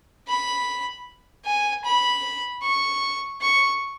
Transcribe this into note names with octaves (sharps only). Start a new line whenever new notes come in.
B5
G#5
B5
C#6
C#6